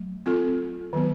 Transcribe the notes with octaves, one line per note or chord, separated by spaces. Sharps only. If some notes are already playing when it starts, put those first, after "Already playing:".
Already playing: F#3 A3
C4 F4 A4
D#3 F#3 B3